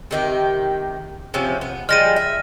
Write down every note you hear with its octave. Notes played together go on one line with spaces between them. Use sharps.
C3 D#3 G4
C3 F3 C#4
B3
F3 G3 G#3 F6 A#6 D#7
E5